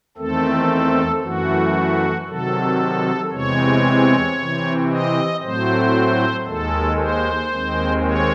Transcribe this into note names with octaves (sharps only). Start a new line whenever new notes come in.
E2 D#3 A3 C4 A4
F#2 E3 A3 F#4
C3 D#3 F#3 A4
E2 C3 E3 G#3 C4 C#5
C3 E3 C4
D#5
A2 F#3 A3 C4 C5
D#2 D#3 G#3 A4
C5
D#2 D#3 G#3 C4
C#5